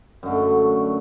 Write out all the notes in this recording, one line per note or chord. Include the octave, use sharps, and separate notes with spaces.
F#2 D3 A3